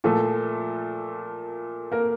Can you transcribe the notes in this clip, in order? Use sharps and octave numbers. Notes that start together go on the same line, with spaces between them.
A#2 F3 A3 A4
A#3 A#4